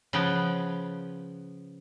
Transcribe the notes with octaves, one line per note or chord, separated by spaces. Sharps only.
C#3 F3 B3 G5